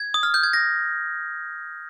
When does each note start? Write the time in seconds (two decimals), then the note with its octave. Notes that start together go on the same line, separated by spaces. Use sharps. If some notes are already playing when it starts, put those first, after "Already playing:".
Already playing: G#6
0.14 D#6
0.23 F6
0.34 G6
0.43 G#6
0.53 A#6